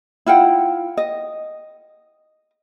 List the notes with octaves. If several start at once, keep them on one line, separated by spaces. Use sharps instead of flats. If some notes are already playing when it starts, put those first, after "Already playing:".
E4 F4 F#5 G5
D#5